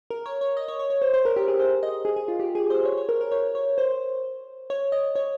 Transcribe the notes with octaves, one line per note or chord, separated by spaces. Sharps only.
A#4
C#5
C#5
D#5
C#5
C#5
C#5
C5
C5
A#4
G4
G#4
C5
D#5
G#4
G#4
F4
G4
G#4
C5
C#5
C#5
A#4
A#4
C#5
C#5
C5
C#5
D#5
C#5